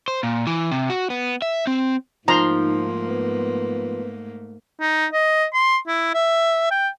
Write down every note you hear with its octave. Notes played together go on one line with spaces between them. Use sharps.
C5
A#2
E3
C3
F#4
B3
E5
C4
G#2 F3 A3 A#3 D#4 A#5 C6
B3
D#4
D#5
C6
E4
E5
G5